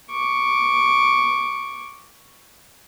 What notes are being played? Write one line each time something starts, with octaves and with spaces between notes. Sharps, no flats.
C#6 D6